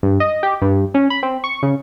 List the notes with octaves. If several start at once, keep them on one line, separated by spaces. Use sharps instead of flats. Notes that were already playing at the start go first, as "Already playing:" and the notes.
G2
D#5
G4
G2
C#4
B5
C4
C#6
C#3